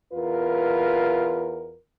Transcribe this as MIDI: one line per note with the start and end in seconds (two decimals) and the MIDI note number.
0.13 1.76 40
0.13 1.76 65
0.13 1.76 70
0.13 1.76 71